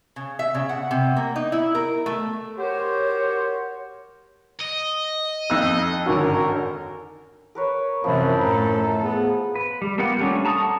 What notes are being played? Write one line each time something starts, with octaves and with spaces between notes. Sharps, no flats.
C#3
E5
C#3
F#5
C3
A#3
D#4
E4
A#4
A3
F#4 G4 A#4 C5 C#5
D#5
F2 D#4 E6 F#6
G#1 D3 C#4 F#4 A#4
A#4 B4 C#5
F#2 C3 E3 F3 A#3 B5
A2 A4 A#5
B3 G#4
B4
G3
A#3 B3 F4 G4 F#5
G3 A3 C#4 D4
A5 A#5 C#6 D#6
F#5 A#5